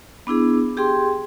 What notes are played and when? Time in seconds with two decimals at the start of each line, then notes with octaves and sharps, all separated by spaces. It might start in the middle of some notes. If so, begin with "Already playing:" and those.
0.27 B3 D4 E4 G#4
0.77 G4 G#4 G5 C6